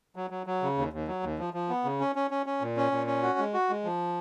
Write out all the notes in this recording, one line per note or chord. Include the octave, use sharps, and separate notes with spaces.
F#3
F#3
F#3
C#3
D#2
D#2
F#3
D#2
F3
F3
B3
C#3
C#4
C#4
C#4
C#4
A#2
C#4
A#2
C#4
F#4
G#3
F#4
G#3
F3